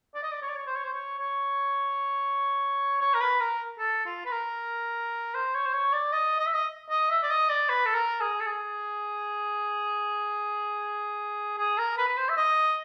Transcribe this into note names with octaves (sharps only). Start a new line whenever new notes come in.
D5
D#5
D5
C#5
D5
C#5
C5
C#5
C5
C#5
C#5
C#5
A#4
B4
A#4
A4
F4
B4
A#4
C5
C#5
C5
C#5
D5
D#5
D#5
E5
D#5
D#5
E5
D5
D#5
D5
B4
A4
A#4
G#4
A4
G#4
G#4
A#4
B4
B4
C5
E5
D#5